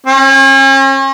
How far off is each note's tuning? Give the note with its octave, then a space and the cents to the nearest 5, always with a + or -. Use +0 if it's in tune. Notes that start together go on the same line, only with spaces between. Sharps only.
C#4 -40